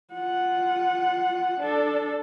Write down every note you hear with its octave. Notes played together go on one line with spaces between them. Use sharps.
F4 F#5
D4 A4